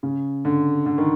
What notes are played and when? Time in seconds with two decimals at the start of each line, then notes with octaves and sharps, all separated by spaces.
0.03 C#3
0.45 D3
0.86 D3
0.98 D#3